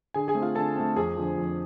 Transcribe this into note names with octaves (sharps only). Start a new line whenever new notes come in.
D3 G#4 G#5
G#4 G#5
A3 C4
F4 F5
D3 A4 A5
A3 C4
F2 G#4 G#5
D3 F3
F2